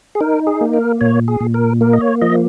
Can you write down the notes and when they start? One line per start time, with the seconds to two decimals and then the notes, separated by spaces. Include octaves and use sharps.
0.15 G#4
0.21 D#4 A#4
0.47 G#4
0.61 A#3
0.73 A#4
1.01 A#2 C#5
1.28 G#4
1.41 A#2
1.54 A#4
1.81 A#3 A#4
1.93 D#5
2.01 C#5
2.21 F3 D#5